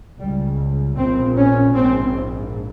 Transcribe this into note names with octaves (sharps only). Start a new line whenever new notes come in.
C#2 C#3 G3
A#1 A#2 C4
C#4
A#1 G#2 C4